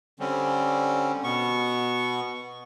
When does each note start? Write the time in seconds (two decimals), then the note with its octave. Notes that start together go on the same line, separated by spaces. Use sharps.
0.20 D3 G3 C4 C#4
1.24 B2 B3 C#6